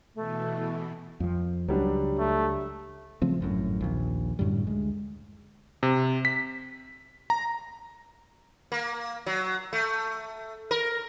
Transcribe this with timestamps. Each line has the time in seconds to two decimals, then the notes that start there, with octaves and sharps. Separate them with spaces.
0.15 B2 E3 A3
1.20 F2 F3
1.68 C#2 F#3 G3 D4
2.19 A3
3.22 C#3 F3 A3 C4
3.40 G#1 F#2 A2
3.81 A#1 D#2
4.39 F#2 A2 D3 G3
4.67 D2 G#3
5.83 C3
6.25 B6
7.30 A#5
8.72 A#3
9.26 F#3
9.73 A3
10.71 A#4